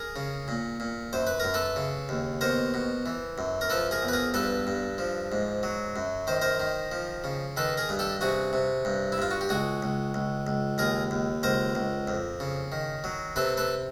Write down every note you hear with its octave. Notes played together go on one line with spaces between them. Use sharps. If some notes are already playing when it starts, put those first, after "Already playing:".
Already playing: G#4 A#4
C#3
A#2
A#2
F#2 C5
B4
F#2 A#4
A4 B4
C#3
D#2
B2 A#4 C5
B2
E3
F#2
A#4
F3 A4 B4
G#4 A#4
E2
B4
G#4 A#4
G2 A4 B4
G2
F3
G#2
F#3
F#2
D#3 C5
A#4 C5
D#3
F3
C#3
D#3 A4 B4
G#4 A#4
G2
G4 A4
C3 F#4 G#4
C3
G2
E4
G2 F4
F#4
G4
C#2 F#4 G#4
C#2
C#2
C#2
D#2 G#4 A#4
D#2
C#2 A#4 C5
C#2
F2
C#3
D#3
F#3
C3 A4 B4
A4 B4